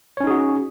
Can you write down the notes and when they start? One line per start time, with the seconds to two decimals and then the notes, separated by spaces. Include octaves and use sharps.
0.17 C#5
0.20 C#4
0.24 D#4
0.27 G#4
0.30 F#4